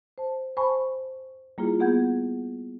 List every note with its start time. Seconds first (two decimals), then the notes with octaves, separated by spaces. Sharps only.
0.18 C5 A5
0.57 C5 G#5 A5 B5 C#6
1.58 G3 A#3 E4 F4 G#4
1.80 B3 G#4 F#5 G6 G#6